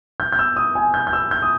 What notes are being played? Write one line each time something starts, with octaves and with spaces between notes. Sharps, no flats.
G6
G6
E6
D#6
G#5
G6
G6
E6
G6
D#6